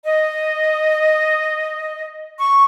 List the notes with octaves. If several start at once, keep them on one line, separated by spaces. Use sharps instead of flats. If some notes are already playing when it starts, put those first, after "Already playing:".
D#5
C#6